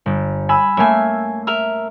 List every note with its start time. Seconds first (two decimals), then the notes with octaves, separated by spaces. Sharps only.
0.06 G1
0.49 G#5 B5 E6
0.77 A3 A#3 C#4 E5 G#5
1.47 A#4 E5